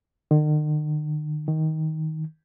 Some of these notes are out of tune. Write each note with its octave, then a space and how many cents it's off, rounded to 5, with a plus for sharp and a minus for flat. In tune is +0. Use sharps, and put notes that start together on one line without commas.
D#3 -45
D#3 +15